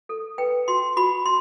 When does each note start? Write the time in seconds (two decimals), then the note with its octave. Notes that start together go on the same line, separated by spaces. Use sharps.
0.09 A4
0.38 B4 G5
0.68 F#4 C6
0.97 F#4 B5
1.26 C6